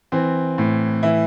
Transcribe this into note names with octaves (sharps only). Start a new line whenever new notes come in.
E3 C4
A2
E3 E4